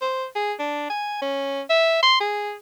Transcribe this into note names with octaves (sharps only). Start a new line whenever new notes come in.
C5
G#4
D4
G#5
C#4
E5
C6
G#4